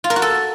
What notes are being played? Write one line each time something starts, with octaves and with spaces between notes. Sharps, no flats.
F4
A#4
F#4
A4